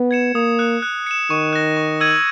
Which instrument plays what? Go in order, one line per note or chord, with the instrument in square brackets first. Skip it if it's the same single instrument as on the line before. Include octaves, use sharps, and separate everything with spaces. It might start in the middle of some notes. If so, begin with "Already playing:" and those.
Already playing: [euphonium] B3
[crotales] G#6 C#7 E7
[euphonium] A#3 [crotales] D#6
[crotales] F#6 C#7
F#6
C#7 E7
[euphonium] D#3 [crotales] C#6
[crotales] F#6 A#6
C#6
E6 G#6 D#7 F#7